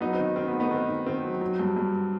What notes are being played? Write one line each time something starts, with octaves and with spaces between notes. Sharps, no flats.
F#3 B3 D#4
C4
D#3
D#3 C4
B3
A3
B3 D#4
D#3 C4
D#3
D#3 C4
F#3
F#3
G2
G2